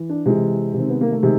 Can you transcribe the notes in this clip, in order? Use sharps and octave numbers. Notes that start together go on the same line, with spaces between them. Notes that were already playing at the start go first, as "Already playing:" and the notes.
Already playing: E3
D4
C3 E3 G#3
C3 D#3 C4
B3
A#3
A3
C3 D#3 G#3